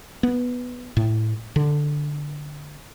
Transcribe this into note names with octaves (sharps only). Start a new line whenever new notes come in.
B3
A2
D3